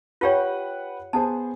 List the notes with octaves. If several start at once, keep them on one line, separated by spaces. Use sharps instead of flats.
F4 G4 B4 C#5 F#5 G5
B3 G#4 C5 A5